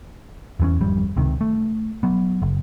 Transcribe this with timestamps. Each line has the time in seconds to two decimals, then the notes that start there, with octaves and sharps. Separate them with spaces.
0.60 E2 E3 B3 C#4
0.80 G#1 F2 G3
1.16 C#2 C3 D#3
1.41 A3
2.03 F#3 B3
2.42 F#1